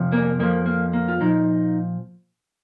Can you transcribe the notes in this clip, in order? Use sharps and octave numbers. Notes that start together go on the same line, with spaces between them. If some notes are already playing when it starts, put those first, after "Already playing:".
Already playing: F2 C3 F3
A#3
F2 F3 A#3
A#3
A#3
F4
A#2 F3 D#4